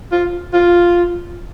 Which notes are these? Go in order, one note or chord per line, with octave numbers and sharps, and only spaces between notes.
F4
F4